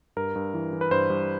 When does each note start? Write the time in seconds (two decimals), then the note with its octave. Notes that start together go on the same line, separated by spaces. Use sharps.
0.16 G2 A#4
0.36 G2
0.54 E3
0.73 E3
0.81 B4
0.91 G2 C5
1.10 G2